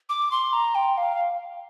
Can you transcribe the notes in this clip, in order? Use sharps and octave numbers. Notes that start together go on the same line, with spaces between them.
D6
C6
A#5
G5
F5